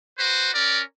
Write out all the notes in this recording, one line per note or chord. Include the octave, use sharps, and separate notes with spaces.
F#4 B4 C5
C#4 A#4 D5